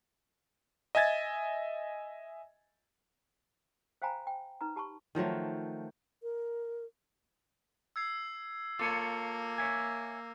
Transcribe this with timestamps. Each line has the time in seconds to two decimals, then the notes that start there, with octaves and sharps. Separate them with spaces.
0.95 D#5 E5 G#5 G#6 A6
4.02 C5 F5 G5 G#5 A#5 B5
4.27 G5
4.61 D#4 B4 A#5
4.76 G4 A5 B5 C#6
5.15 D#3 F3 F#3 A3
6.23 A#4
7.96 E6 G#6 C7
8.79 A#3 F4 A4 C#5 D6
9.58 C#5 E5 G#5